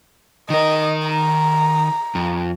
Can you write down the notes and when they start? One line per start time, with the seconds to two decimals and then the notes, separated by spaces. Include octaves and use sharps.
0.50 D#3 A#4 D#5
1.08 A#5
2.15 F2